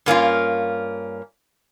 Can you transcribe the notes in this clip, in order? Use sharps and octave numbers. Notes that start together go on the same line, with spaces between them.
G2 A#3 C#4 F4